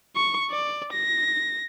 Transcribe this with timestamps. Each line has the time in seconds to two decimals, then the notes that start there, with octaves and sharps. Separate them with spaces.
0.16 C#6
0.50 D5
0.93 A#6